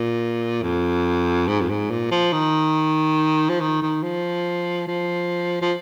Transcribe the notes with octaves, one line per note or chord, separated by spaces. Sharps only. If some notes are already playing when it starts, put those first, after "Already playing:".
Already playing: A#2
F2
G#2
F2
G#2
A#2
F3
D#3
F3
D#3
D#3
F3
F3
F3